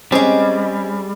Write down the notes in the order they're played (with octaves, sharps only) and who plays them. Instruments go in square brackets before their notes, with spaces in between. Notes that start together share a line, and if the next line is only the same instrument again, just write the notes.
[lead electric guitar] G3 [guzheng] G#3 G#4 [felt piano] C4 C#4